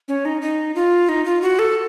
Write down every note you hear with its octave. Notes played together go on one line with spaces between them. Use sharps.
C#4
D#4
D#4
F4
D#4
F4
F#4
A4